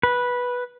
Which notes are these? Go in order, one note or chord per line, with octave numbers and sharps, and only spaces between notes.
B4